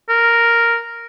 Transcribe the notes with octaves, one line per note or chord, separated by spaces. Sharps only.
A#4